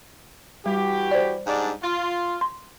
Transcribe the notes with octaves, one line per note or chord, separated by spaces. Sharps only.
E3 G3 F#4 G4
C5 D5
G#2 G3 D4
F4
C6